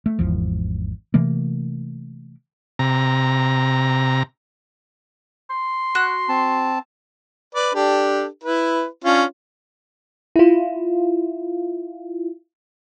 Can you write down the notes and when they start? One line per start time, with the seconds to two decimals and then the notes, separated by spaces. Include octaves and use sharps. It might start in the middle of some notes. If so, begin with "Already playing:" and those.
0.06 A3
0.19 G#1 E2 F3
1.14 C3 E3 A3 A#3
2.79 C3 A#5
5.50 C6
5.95 F#4 F#6
6.29 C4 A5
7.55 B4 D5
7.74 D4 G4 A4
8.44 E4 B4
9.04 C#4 D4 F4
10.36 E4 F4